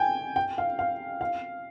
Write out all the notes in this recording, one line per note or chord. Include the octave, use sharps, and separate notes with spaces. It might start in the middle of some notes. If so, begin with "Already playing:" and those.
Already playing: G5 G#5
G5
F5
F5
F5